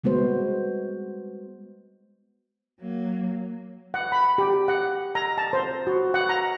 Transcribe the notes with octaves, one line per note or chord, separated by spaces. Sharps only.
G3 G#3 B3 F#4 C5
F#3 A#3
F#5
B5
G4
F#5
A#5
A5
C5
F#4
F#5
A#5